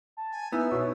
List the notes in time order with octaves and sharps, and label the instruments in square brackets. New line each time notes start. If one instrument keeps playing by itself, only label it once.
[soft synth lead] A5
[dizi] G#5
[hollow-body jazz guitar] B3 [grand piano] D#4 [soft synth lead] E4 [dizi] E6
[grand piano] B2 [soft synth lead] C#5